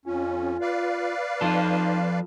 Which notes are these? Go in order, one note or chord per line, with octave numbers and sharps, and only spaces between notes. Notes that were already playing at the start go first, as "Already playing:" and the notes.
F2 C#4 F4
B4 D5 F5
F3 D#4 A4